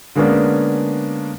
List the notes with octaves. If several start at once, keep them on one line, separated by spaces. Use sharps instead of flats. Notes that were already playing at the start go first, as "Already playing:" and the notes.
D3 G#3 A#3 B3 C#4 D4